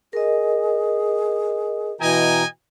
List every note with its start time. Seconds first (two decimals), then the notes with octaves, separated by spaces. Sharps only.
0.13 G#4 A#4 D#5
2.01 B2 E3 D#5 G5 G#5 A#5